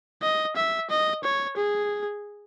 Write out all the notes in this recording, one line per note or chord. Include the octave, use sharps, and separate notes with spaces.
D#5
E5
D#5
C#5
G#4